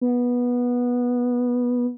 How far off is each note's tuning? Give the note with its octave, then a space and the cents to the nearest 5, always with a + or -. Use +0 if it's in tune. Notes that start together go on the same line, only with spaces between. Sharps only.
B3 -15